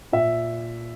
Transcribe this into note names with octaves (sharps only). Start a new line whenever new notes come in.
A#2 E5